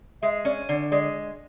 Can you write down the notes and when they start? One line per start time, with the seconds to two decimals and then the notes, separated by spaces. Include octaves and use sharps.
0.22 G#3 E5
0.45 C#4 D5
0.69 D3 D5
0.91 G#3 D5